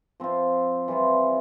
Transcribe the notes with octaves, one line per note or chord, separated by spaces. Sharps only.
F3 C4 F4
E3 G3 C4 F4